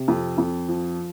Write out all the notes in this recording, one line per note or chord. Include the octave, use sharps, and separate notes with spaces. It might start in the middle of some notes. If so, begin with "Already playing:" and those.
Already playing: C3
F2
F2
F3